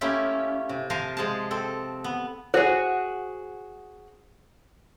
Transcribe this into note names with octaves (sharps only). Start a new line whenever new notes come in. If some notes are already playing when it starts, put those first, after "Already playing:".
A3 A#3 C#4 E4 F4 G4
C3
F3 A#4 C5 F5 G#5 A5
F3 G#3 G#4 C5 A5
C4 A4
B3
F#4 G#4 C5